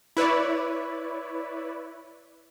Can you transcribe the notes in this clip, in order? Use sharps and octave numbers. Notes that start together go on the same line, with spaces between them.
E4 B4 C#5 D5